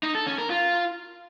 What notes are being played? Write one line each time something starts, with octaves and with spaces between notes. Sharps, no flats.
D#4
A4
C#4
A#4
F4